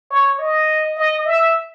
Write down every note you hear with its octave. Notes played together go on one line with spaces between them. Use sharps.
C#5
D#5
D#5
E5